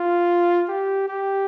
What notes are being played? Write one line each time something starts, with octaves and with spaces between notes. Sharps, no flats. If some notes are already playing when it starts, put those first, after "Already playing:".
Already playing: F4
G4
G4